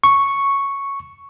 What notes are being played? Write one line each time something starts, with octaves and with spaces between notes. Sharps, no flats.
C#6